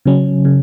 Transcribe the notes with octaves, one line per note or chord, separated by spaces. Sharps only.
C#3 F#3 C#4
C#3